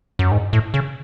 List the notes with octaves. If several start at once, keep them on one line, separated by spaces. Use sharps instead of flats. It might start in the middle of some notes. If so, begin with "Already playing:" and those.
F#2
G#2
A2
C#3